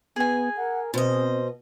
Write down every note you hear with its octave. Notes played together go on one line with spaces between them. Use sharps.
B3 G#4 G#5
A#4 F#5
B2 C4 C5 D#5